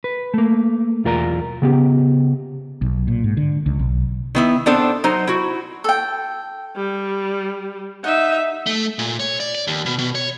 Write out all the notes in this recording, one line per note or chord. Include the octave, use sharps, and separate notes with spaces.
B4
A3 A#3
B1 E2 F4 A#4 D5 A#5
C#3 B3 G4
B1
A#2
G#2
D3
C#2
B1
D#3 B3 E4
B3 C4 D4 A4 C5
F#3 D#4 C5
E4 F#4
A4 G5
G3
D#4 E5 F#5
A3
A#2
C#5
D5
D5
D#2
B2
B2
C#5